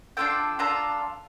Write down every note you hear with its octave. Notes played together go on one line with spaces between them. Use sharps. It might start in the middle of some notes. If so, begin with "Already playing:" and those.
D4 F4 A4 G5
D4 F4 A4 A#5